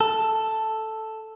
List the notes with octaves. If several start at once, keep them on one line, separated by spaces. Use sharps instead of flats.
A4